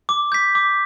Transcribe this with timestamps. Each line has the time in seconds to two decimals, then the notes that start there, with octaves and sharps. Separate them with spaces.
0.09 D6
0.32 G6 B6
0.55 D6